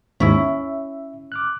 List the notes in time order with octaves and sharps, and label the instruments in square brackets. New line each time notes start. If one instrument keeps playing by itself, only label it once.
[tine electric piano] D#2 G#2 [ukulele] C#4 E4
[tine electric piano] E5
D6 F6 F#6